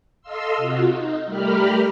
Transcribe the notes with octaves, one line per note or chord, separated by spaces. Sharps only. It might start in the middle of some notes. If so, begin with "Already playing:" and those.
A4 D#5 F5 C6 E6
C3 F4 F#4
D#4
G3 A3 G4 A#4 B5 F6